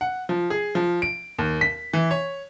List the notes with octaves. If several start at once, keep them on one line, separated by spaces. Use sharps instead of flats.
F#5
F3
G#4
F3
D7
D#2
B6
E3
C#5